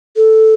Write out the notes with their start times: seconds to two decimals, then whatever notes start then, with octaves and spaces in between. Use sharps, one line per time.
0.16 A4